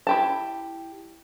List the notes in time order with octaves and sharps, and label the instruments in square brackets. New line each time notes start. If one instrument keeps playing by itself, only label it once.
[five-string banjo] E4 G4 A5